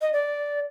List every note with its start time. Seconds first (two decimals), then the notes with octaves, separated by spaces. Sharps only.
0.02 D#5
0.13 D5